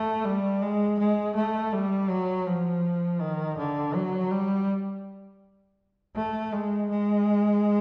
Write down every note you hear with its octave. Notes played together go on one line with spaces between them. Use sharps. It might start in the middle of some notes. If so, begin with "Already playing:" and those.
Already playing: A3
G3
G#3
G#3
A3
G3
F#3
F3
D#3
D3
F#3
G3
A3
G#3
G#3